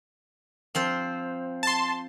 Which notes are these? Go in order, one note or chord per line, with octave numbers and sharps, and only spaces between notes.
F3 C4 C5
A5 C6